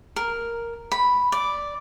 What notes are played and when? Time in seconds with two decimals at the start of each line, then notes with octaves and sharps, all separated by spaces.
0.16 A#4
0.92 B5
1.32 D5